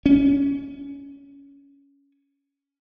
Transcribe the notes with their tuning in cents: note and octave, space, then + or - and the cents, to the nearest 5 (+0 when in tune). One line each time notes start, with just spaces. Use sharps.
C#4 +15